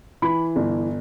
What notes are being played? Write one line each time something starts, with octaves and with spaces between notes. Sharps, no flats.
E3 B5
G1